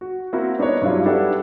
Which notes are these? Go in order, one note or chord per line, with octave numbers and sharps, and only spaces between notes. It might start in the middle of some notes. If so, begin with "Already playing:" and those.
F#4
A#3 C4 E4 F#4 A#4
B3 D4 D#4 C5 C#5
G2 F#3 D4 E4 F4
D4 E4 G4 A4 B4 F#5